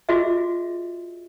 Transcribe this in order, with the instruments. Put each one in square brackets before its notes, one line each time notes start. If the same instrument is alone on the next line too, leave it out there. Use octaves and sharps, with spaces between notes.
[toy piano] F4 F#4 G#4 D#5 E5